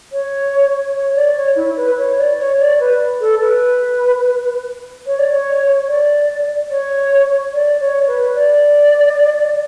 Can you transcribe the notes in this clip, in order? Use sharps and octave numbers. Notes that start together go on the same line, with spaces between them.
C#5
C#5
D5
C#5
E4
B4
C#5
D5
C#5
D5
B4
A4
B4
C#5
D5
C#5
D5
C#5
D5
C#5
B4
D5